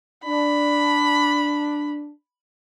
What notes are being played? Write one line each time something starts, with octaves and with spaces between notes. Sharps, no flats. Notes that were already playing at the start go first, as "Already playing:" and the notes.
D4 B5